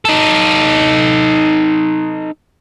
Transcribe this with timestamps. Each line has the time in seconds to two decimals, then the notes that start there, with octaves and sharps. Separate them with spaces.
0.05 D#4 A4